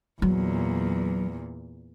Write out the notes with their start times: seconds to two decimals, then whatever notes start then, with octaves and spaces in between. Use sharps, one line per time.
0.22 E2 A#2 F#3